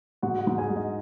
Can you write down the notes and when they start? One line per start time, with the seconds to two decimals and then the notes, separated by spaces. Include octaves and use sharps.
0.22 G#2 F#4 F#5
0.41 F#4 F#5
0.47 G#2
0.58 G#4 G#5
0.70 G#3
0.76 D#5